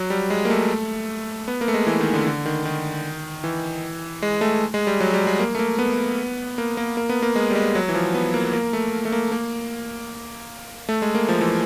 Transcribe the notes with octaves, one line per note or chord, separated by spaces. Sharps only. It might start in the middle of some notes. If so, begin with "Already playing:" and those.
Already playing: F#3
G3
G#3
A#3
A3
B3
A#3
A3
G#3
E3
D#3
D3
D3
D#3
D#3
E3
G#3
A3
G#3
G3
F#3
G3
G#3
A#3
A3
A#3
B3
A#3
A#3
A#3
B3
A#3
G#3
G3
G#3
F#3
E3
F3
B3
A#3
A#3
A3
A3
A#3
A#3
A3
G#3
A#3
F3
E3